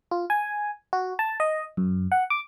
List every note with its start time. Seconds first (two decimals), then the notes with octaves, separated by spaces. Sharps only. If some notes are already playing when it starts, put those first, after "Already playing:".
0.11 F4
0.30 G#5
0.93 F#4
1.19 A5
1.40 D#5
1.77 F#2
2.12 F#5
2.30 D6